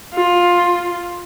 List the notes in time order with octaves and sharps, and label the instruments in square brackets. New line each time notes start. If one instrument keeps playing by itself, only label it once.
[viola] F4